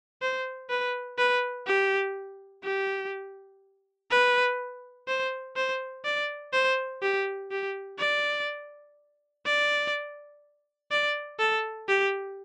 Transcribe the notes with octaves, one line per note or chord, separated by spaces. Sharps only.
C5
B4
B4
G4
G4
B4
C5
C5
D5
C5
G4
G4
D5
D5
D5
A4
G4